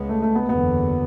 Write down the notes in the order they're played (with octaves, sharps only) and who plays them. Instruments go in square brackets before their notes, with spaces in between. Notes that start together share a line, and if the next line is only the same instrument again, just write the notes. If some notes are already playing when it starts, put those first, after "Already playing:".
Already playing: [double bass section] C#2 C#3 G#3 B3
[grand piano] A3
A3
B3
[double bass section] F#1 E2 D3 F#3 [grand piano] B3